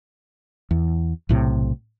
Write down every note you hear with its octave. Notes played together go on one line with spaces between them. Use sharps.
E2
B1 A2 C3